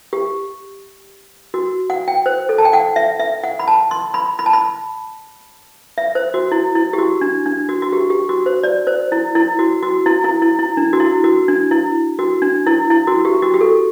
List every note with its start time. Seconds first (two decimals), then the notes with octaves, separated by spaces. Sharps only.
0.13 G4
1.54 F#4
1.90 F#5
2.08 G5
2.26 C5
2.49 A4
2.58 A5
2.65 G5
2.73 F#5
2.96 E5
3.20 E5
3.44 F#5
3.59 B5
3.68 A5
3.91 C6
4.14 B5
4.39 B5
4.46 A5
4.53 B5
5.98 E5
6.15 C5
6.34 F#4
6.52 E4
6.75 E4
6.93 G4
6.98 F#4
7.21 D4
7.46 D4
7.69 F#4
7.82 F#4
7.92 G4
8.10 G4
8.29 F#4
8.46 C5
8.63 D5
8.87 C5
9.12 E4
9.35 E4
9.59 F#4
9.83 F#4
10.06 E4
10.24 E4
10.42 E4
10.59 E4
10.77 D4
10.93 F#4
11.00 E4
11.24 F#4
11.48 D4
11.71 E4
12.19 F#4
12.42 D4
12.67 E4
12.90 E4
13.07 F#4
13.25 G4
13.42 F#4
13.54 G4
13.61 A4